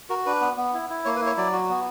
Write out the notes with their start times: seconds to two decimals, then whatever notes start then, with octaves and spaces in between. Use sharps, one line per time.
0.10 F#4 A#4
0.26 D4 B4
0.41 B3
0.57 B3
0.74 E4
0.90 E4
1.05 A#3 C#5
1.16 B4
1.21 E4
1.26 C#5
1.37 F#3 D5
1.52 F#4
1.69 B3